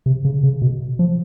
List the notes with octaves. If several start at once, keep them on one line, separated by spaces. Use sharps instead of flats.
C3
C#3
C#3
B2
F3